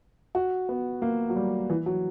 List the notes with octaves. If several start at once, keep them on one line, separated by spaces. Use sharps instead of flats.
F#4
B3
A#3
F#3
G3
E3
F#3